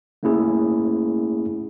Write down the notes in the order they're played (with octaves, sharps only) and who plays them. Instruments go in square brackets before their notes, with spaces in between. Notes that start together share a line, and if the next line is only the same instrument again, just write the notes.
[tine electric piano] A3 A#3 C#4 E4 G#4